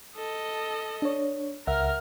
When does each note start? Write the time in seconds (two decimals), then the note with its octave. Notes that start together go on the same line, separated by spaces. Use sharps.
0.17 A4 D#5
1.02 D4 C#5
1.67 C#2 A#4 E5 F#5 F6